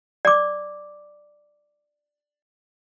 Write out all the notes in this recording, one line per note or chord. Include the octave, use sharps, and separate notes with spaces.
D5 D6